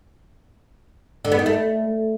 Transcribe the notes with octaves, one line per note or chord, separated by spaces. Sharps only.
D3
B3
D#3
A3